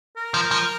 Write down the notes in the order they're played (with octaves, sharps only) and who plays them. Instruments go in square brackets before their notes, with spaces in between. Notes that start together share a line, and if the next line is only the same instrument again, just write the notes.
[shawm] A#4
[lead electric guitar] F3
F3